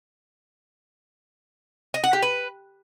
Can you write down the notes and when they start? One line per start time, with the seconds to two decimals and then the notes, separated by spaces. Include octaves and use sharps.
1.94 D#5
2.04 F#5
2.13 G4
2.22 B4